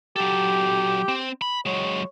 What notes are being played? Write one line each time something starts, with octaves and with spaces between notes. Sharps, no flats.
F#3 G4 A4
C4
B5
F#3 G#3 C#5